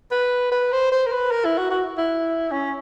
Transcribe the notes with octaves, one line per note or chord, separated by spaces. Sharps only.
B4
B4
C5
C5
A#4
B4
A#4
E4
F#4
F#4
E4
C#4